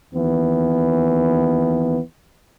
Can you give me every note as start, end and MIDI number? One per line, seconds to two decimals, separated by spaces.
0.14 2.00 39
0.14 2.00 52
0.14 2.00 59